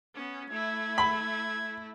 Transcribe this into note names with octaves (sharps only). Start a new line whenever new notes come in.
B3 C#4
A3 E4 G#6
B5